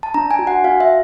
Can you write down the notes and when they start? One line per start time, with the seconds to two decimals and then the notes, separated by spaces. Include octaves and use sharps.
0.03 A5
0.14 D4 A#5
0.31 G#5
0.39 F#4
0.47 F#5
0.64 F#4 F5
0.80 E5